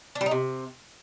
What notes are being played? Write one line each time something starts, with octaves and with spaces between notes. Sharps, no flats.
D4
G3
D#4
C3